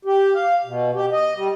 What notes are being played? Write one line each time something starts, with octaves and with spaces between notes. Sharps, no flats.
G4
F5
B2
G4
D#5
G3